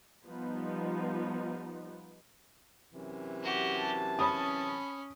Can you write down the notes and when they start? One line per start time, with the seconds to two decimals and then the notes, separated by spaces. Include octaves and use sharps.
0.25 F3 G3 B3 D#4
2.93 F#2 C3 E3
3.43 F#4 G4
3.79 A5
4.19 C#4 B5 D#6